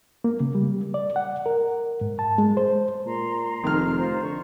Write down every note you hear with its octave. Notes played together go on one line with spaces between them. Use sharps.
A#3
C#3
G3
D5
F#5
A#4
G#2
A5
G#3
C5
A#2 A#5 C6
F1 D#3 F6
F4 C5 A#5
D3 C#6